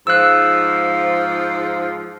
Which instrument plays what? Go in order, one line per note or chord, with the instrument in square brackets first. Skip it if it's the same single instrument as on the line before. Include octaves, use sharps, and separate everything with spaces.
[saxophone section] G#2 F3 [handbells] E6 F#6